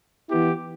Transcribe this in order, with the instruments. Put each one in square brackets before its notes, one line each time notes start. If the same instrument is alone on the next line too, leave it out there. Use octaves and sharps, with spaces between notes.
[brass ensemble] E3 B3 E4 G4